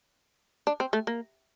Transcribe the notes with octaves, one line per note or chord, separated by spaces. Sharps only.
D4
C4
A3
A#3